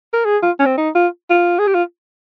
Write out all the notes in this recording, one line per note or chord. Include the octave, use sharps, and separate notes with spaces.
A#4
G#4
F4
C#4
C4
D#4
F4
F4
G#4
G4
F4